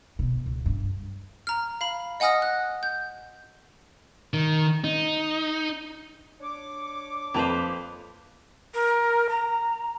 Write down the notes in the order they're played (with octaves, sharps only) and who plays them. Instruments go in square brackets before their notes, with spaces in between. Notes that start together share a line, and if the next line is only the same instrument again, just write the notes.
[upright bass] B2
C#2
G2
[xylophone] A#5 F6
F5 B5
D#5 F#5 G#5 D#6 F6 A#6
F#6
G6
[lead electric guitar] D#3
D#4
[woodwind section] D4 C#5 D6
[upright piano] F2 A5 F7 [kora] A#3 B4 C5
[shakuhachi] A#4
A#5